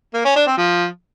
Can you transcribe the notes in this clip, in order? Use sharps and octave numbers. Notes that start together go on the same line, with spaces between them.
A#3
C#4
D4
C4
F3